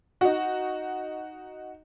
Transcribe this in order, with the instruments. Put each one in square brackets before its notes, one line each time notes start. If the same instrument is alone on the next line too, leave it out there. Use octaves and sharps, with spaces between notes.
[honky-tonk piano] D#4 F#4